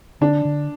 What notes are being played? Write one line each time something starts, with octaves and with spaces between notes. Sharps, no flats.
D3 D4
D3